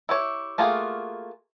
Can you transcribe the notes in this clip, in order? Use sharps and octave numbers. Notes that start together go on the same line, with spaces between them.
E4 G4 C#5
A3 A#3 F4 F#4 G#4